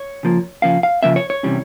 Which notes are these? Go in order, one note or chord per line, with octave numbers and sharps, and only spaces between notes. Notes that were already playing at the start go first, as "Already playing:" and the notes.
Already playing: C#5
C#3 F3 A#3
C#3 F3 A#3 C#4 F5
F5
C#3 F3 A#3 C#4 E5
C#5
C#5
C3 E3 G3 C#4